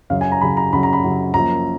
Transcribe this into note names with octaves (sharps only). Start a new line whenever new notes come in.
F#2 C#3 F#3 F5
G#5
A#5
F#2 C#3 F#3 B5
A#5
F#2 C#3 F#3 B5
A#5
B5
F#2 C#3 F#3
F#2 F3 A#3 A#5